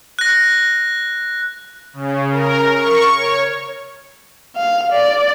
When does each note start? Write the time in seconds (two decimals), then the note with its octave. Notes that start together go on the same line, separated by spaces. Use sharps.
0.19 F#6 A#6
1.93 C#3
2.31 A#4
2.75 C#6
3.15 C#5
4.57 F5
4.92 D5